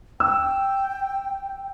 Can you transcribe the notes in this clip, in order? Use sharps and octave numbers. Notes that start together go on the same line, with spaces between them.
G5 E6